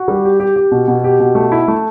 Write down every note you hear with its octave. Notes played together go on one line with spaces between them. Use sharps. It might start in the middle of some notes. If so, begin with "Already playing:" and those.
Already playing: F#4
G3
G4
G4
G4
B2
B2
G4
B2
A3
E4
A3